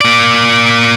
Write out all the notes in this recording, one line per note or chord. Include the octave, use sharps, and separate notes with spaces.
A#3 D5